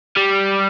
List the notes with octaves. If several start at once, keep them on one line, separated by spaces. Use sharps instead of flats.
G3